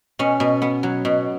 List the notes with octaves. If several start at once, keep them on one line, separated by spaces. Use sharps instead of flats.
B2 C#4
B2
B3
F#3
B2